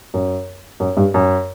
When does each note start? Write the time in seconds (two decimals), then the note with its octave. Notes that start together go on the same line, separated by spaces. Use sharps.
0.14 F#2
0.80 F#2
0.97 G2
1.14 F#2